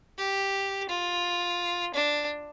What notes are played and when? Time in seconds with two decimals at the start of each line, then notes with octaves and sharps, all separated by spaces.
0.18 G4
0.89 F4
1.94 D4